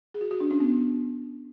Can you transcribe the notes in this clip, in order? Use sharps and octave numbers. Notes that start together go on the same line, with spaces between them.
G#4
F#4
F#4
D4
C#4
B3